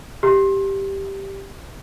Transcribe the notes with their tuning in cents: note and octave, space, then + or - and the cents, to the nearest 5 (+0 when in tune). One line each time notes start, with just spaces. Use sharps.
G4 +0